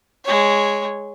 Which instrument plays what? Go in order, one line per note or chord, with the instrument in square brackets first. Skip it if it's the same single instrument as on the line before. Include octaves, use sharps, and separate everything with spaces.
[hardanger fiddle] G#3 C#5